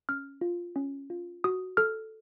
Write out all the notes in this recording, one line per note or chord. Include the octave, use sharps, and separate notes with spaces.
C#4 F6
F4
C#4
F4
F#4 D#6
A4 F6